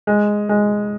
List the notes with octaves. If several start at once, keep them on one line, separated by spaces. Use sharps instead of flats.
G#3
G#3